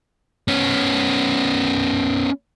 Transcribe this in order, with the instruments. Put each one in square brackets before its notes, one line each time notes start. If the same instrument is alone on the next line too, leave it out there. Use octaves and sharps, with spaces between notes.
[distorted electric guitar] B3 C#4